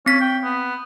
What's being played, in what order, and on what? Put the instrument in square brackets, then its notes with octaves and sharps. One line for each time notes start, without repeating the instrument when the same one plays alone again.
[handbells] C4 B6 [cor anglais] C#4
[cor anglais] G5
B3